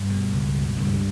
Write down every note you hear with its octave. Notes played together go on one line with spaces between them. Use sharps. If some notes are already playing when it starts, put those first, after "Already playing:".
Already playing: G2 G3
B2
C#2
B2
C#2 G2 G3